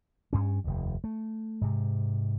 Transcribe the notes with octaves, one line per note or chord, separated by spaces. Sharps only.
G2 C#4
F1 D#2
A3
G#2 C3